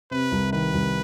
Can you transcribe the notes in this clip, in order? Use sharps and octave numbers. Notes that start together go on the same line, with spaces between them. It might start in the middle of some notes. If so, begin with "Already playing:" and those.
C3 B4
C2
D#3 B4
C2